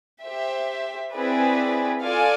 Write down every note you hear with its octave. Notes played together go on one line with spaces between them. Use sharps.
G4 C5 E5
C4 E4 G#4 B4 D5
F4 A4 D5 F5 G#5